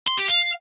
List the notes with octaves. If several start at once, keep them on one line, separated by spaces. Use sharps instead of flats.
C6
G4
F5